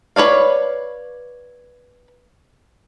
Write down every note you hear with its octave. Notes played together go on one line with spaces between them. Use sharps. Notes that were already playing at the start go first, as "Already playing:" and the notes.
B4 C#5 D5 F5